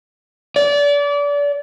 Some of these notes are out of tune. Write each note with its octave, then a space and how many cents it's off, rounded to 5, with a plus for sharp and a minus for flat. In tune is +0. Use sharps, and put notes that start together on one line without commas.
D5 -30